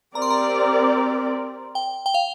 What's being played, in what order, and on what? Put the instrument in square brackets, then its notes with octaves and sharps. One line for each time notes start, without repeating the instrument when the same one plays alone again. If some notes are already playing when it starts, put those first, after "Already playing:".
[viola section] C4 G4 A#4 D5 [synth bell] A#5
[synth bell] C6
A#5
G5
G5
F5